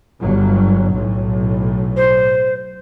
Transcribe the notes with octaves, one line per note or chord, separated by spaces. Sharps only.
G1 G2 F#3
B1 A2
C5